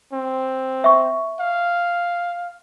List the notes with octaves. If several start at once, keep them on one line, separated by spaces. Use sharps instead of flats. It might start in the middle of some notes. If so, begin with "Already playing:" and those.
C4
E5 C#6
F5